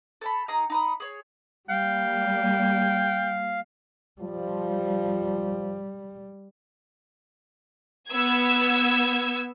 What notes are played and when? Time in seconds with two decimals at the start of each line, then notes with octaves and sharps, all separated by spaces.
0.21 A4 A5 B5
0.48 D#4 G#4 A#5 D#6
0.70 D#4 B5 D#6
1.00 G#4 C#5
1.69 G3 A#3 F5 G5
4.21 F3 G3
8.10 B3 E6 G#6